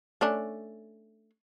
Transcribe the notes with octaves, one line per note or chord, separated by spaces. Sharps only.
A3 C#4 D4